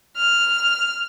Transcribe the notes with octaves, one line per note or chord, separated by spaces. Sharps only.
F6